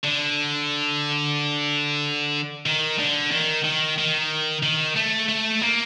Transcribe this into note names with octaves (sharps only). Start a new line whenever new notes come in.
D3
D#3
D3
D#3
D#3
D#3
D#3
A3
A3
A#3